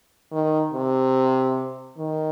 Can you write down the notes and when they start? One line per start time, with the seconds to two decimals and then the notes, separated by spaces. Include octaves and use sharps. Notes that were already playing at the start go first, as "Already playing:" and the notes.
0.32 D#3
0.74 C3
1.98 D#3